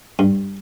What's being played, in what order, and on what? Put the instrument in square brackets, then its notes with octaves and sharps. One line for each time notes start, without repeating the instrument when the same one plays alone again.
[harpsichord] G2